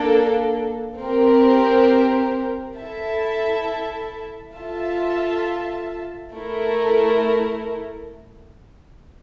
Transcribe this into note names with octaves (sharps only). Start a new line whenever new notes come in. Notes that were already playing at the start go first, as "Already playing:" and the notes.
Already playing: A#3 D4 A4
C4 G4 A#4
E4 A4 E5 A5
F4 A4 E5 A5
A3 E4 A#4